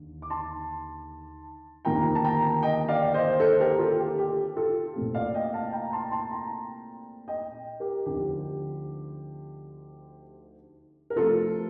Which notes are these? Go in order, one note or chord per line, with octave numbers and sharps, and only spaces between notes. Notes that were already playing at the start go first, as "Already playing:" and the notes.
Already playing: D#2 D3
D6
A5 C6
D2 C3 D#3 A#3 F4 G5 A#5
A5
G5 A#5
D#5 G5
D5 F5
F5
C5 D#5
A4 C5
G4 A#4
F4 A4
G4
G4
F4 A4
C2 A#2 A3 C4
D5 F5
D#5 G5
F5 A5
G5 A#5
A5 C6
A5 C6
G5 A#5
D#5 G5
G4 A#4
D2 D3 F3 C4 D#4 G4
A#4
C3 F3 A3 F4 A4